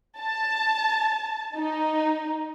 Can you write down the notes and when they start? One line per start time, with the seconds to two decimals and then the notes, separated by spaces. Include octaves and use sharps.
0.19 A5
1.55 D#4